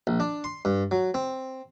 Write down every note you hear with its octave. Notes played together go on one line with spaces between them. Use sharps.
A#1
D4
C6
G2
F#3
C4